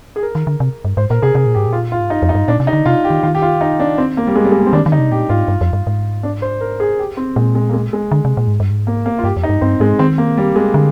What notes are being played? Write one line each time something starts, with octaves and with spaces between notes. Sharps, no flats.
G#4
A#4
D#3
D3
C3
G2
G#2 C5
A#2 A#4
C3 G#4
C3 G#4
A#2
G#2 G4
A#2
F4
F4
G#2
G2 D#4
F2
D#4
G2
A#2 D4
C3
D#4
D3
C3 F4
G4
D#3
D#3 F4
G4
F4
D#4
D4
C4
A#3
G3
G#3
G3
G#3
A#3
C4
D#3 D4
D#3
D3 D#4
C3
A#2 G4
G#2 F4
G2
F2
G2
G#2
D4
C5
A#4
G#4
G4
C4
A#2 G#3
G#3
A#3
G#3
G#3
D3
C3
A#2
G#2
G2
G#2
A#3
A#3
F4
G2 G4
F2
D#4
G2
G2 C4
G#2 G#3
D#3 C4
A#3
G3
G#3
D3